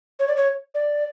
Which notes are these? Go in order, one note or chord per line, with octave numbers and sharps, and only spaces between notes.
C#5
D5
C#5
D5